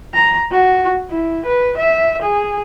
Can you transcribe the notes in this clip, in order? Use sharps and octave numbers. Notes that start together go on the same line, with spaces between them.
A#5
F#4
E4
B4
E5
G#4